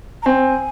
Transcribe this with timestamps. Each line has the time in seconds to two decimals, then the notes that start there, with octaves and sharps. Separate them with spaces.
0.22 A#5
0.26 C4 G#5